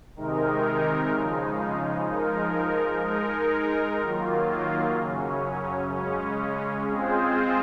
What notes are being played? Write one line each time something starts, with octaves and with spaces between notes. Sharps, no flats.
C3 D#3 G#3 D#4 A#4
C#3 F3 G#3 D#4
F3 G#3 D#4 A#4
G#3 D#4 A#4
D#3 F#3 A#3 F4
F#2 C#3 F#3 C#4
C#3 G#3 C#4
G#3 C4 F4 G#4 C5